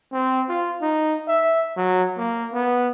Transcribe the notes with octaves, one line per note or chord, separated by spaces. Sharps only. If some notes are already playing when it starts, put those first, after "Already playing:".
C4
F4
D#4
E5
F#3
A#3
B3